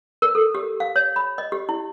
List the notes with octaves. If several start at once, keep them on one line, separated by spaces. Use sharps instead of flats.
A#4
A4
G4
F5
C#5
B5
D#5
G4
E4